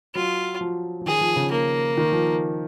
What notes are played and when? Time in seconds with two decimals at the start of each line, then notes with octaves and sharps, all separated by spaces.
0.15 F#3 F4
0.61 F3
1.01 F3
1.06 D#3 G#4
1.21 F3
1.36 C#3
1.52 A#3
1.97 D#3
2.12 F3